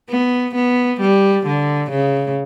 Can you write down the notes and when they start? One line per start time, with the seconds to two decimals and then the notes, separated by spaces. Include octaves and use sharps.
0.10 B3
0.55 B3
1.01 G3
1.47 D3
1.91 C#3